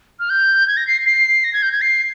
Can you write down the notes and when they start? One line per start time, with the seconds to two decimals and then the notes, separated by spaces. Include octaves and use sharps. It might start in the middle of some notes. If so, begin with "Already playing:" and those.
0.20 F6
0.30 G6
0.68 G#6
0.77 A#6
0.87 C7
1.06 C7
1.44 A#6
1.53 G#6
1.62 G6
1.72 G#6
1.81 C7